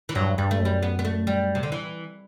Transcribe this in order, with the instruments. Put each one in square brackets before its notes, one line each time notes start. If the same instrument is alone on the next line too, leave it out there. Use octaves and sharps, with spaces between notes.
[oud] E3
[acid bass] G2 [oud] F#3
[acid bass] G2 [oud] G3
[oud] A3
[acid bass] F#2
[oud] G3
B3
B3
A3
G3
C3
D3
E3